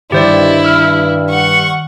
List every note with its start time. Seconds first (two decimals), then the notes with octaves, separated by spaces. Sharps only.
0.12 G2 D#3 E4 G4 C5 D5
0.64 E6 F6
1.30 F#5 C#6